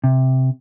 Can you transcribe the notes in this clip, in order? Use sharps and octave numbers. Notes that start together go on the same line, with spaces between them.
C3